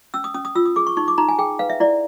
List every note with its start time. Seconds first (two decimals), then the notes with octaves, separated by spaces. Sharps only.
0.14 C#4 E6
0.24 D#6
0.34 C#4 D#6
0.45 D#6
0.55 F4 E6
0.66 D#6
0.76 G#4 D6
0.87 C#6
0.97 D#4 C#6
1.08 D6
1.18 D#4 A#5
1.29 G#5
1.39 G#4 G5
1.59 B4 F5
1.70 E5
1.80 E4 D5